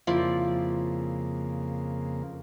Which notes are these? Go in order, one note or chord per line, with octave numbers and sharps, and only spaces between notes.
F2 C#3 F3 A#3 E4 D5